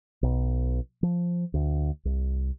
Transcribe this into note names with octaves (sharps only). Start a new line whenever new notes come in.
B1
F3
D2
C2